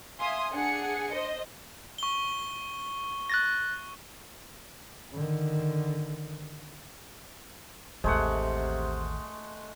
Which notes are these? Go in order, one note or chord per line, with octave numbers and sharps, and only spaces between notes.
E5 F5 G#5 C6 D#6
D4 G#4 F#5 C#7
C5 D#5
C#6 G7
F#6 A6 A#6
D3 D#3
A1 D#2 C3 G#3 A3 F#5